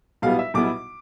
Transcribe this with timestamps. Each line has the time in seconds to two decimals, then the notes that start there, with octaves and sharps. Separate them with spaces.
0.22 B1 B2 G3 B3 E4 F5
0.39 E5
0.54 B1 B2 G3 B3 E4 D6